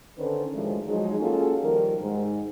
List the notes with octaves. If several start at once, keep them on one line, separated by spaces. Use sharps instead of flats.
D3 D#3 C#4 A4 B4 C5
D2 A2 D#3 F3 G#3
F3 F#3 G#3 D#4 G#4
A#3 C#4 F4 F#4 G#4 A4
D#3 F3 G3 A#4
G#2